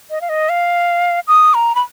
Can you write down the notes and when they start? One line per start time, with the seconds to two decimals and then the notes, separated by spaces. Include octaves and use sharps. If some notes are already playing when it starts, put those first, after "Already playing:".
0.11 D#5
0.21 F5
0.29 D#5
0.49 F5
1.28 D#6
1.54 A#5
1.75 B5